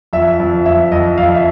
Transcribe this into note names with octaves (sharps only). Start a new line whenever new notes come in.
F2 E5
F2
F2 E5
F2 D#5
F2 F5
E5